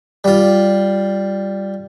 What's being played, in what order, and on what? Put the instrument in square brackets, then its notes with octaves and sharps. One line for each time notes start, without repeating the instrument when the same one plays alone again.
[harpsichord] G3 F4